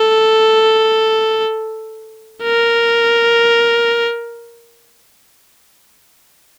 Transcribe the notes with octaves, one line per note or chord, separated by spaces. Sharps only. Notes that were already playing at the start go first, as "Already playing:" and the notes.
Already playing: A4
A#4